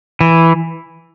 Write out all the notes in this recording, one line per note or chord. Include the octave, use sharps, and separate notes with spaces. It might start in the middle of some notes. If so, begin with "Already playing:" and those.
E3